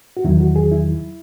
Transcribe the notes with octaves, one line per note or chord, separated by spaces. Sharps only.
F#4
E2 D#3 F#3 E4
F#4
G#4
E4